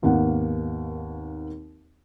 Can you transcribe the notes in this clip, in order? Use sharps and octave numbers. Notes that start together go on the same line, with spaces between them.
G#1 D#2 A#3 B3 F#5